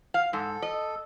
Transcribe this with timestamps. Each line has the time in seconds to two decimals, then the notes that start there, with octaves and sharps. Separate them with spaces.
0.14 F5
0.33 G#2 A4
0.62 D#5